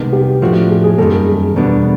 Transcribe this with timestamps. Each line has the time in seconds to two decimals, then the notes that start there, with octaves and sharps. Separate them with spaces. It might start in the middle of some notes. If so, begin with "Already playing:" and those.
Already playing: C2 C3 D#3 G#3 B3
0.13 G4
0.41 A2 F3 A3 D4 F#4
0.69 G#4
0.84 G#4
0.98 F#2 D#3 G3 A#3 A4
1.12 A#4
1.27 G#4
1.56 E2 B2 G3 B3 D4